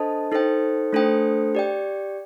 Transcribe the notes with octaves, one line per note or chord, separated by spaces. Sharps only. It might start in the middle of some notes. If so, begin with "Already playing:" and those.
Already playing: D4 A4 C5 D#5 A5
D#4 A4 C5 G5
A3 D4 A4 C5 G5
G4 D5 G5